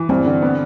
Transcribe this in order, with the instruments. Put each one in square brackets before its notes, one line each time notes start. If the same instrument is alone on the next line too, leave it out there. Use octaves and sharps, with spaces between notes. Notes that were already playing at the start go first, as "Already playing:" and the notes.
Already playing: [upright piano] E3
[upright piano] G2 [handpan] C4
[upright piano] D3
B3